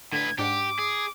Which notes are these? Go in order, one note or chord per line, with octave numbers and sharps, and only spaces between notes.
A2 D3 B4 G#6
G#2 D4 G4 F#5 D6
G#4